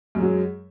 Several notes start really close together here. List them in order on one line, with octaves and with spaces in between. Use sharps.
F#2 G#3 F#3